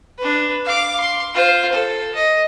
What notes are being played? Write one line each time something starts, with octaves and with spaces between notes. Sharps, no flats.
D4 B4
F5 D6
C6
F4 C5
A4
D#5